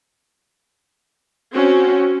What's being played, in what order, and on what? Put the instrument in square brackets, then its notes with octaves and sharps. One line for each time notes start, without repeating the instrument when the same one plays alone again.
[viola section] C4 C#4 F#4